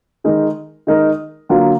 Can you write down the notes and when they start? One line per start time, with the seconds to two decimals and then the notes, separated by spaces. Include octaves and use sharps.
0.24 D#3 G#3 D#4 A#4
0.87 D#3 G#3 D#4 A#4
1.49 D3 F#3 A#3 F4